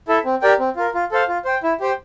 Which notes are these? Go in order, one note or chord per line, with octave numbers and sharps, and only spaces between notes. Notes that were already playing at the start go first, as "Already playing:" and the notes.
E4 A4 E5
C4
G4 A#4 D5 G5
C4
F4 A#4
F4
A4 C5 F5
F4
C5 G5
E4
G4 C5 G5